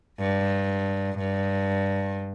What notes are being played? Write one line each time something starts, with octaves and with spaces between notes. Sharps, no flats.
G2
G2